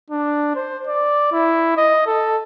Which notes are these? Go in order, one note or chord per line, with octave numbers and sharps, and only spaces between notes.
D4
C5
D5
E4
D#5
A4